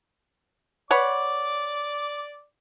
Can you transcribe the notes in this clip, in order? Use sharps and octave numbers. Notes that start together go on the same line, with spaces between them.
B4 C#5 D5 F#5 D6